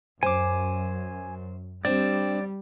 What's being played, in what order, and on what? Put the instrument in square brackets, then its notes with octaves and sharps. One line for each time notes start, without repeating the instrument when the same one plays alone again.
[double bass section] F#2 [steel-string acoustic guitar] C5 [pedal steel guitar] G#5 D6
[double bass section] G3 [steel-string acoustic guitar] C4 D4 [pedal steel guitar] D5